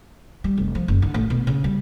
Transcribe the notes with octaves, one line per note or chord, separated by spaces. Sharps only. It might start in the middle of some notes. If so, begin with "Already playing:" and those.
G3
F1
F3
F#1
D3
A1
B2
C#3
G3